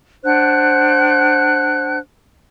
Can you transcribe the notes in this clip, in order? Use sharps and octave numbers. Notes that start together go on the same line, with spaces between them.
D4 C5 F#5 F#6